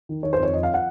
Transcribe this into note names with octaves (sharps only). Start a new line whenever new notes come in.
D#3
D#3 C#5
C5
F2 C#5
F3 D#5
F5
F#5